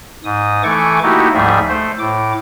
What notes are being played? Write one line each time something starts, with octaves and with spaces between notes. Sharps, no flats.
G#2 D#6
E3 A3 A4 G#5 C#6 D6
A3 A#3 D#4 E4 F#4 G4
D2 G#2 F3 G3 G#4 E5
A3 C5
A2 D6